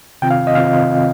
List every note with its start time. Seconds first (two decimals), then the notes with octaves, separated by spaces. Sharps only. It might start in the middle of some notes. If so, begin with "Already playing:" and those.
0.22 C3 D#3 C4 F4 G5
0.31 F5
0.47 D#5
0.55 C3 D#3 C4 F4 F5